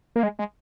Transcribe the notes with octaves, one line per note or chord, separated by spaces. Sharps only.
A#3
G#3
G#3